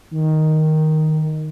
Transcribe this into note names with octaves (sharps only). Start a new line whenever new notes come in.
D#3